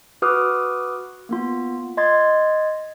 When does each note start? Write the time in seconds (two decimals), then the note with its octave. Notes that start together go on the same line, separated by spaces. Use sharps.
0.22 F#4 B4 D6 D#6 F6
1.29 A#3 B3 F4
1.97 D#5 C6 G#6 A6